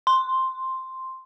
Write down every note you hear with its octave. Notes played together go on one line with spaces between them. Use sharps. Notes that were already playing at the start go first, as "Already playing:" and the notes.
C6